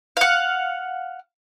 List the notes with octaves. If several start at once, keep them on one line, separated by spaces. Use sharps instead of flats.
F5 F#5